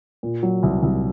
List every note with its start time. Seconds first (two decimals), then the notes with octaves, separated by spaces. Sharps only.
0.23 A#2
0.43 F#3
0.63 C2
0.83 C2